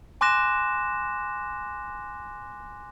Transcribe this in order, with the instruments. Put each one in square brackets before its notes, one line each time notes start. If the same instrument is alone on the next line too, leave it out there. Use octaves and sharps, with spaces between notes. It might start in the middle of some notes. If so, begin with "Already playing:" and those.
[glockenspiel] G#5 C6 D6 F#6 A#6 E7